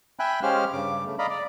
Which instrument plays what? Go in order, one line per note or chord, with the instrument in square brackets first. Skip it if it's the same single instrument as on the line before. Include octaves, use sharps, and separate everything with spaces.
[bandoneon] E5 G5 G#5 B5 F#6
G#3 C#4 G4 C5 F5 F6
G2 C#3 D6
C#3 A3
D5 D#5 F5 A#5 B5
D5